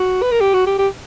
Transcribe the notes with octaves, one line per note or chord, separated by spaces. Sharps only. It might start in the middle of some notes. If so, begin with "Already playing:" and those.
Already playing: F#4
B4
A#4
G4
F#4
G4
G4